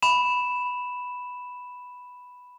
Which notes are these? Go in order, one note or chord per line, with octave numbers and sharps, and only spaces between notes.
B5 E7